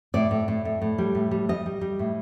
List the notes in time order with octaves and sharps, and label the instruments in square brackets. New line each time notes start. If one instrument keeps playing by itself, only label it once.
[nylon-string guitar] A2 D5
A2
A2
A2
A2
G3
A2
G3
G3 D#5
G3
G3
A2